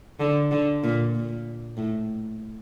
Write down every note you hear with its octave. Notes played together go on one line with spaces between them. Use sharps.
D3
D3
A#2
A#2
A2